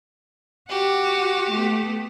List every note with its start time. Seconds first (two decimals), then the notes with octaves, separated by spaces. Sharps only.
0.70 F#4 G4
1.50 A3 B3